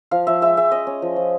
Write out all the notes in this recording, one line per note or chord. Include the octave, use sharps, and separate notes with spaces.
F3 F5
F3 E5
G#3 E5
G#3 E5
C#4 D#5
C#4
F3
F3